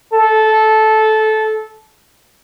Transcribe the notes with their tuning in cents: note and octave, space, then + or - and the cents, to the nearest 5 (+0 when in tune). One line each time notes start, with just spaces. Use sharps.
A4 -15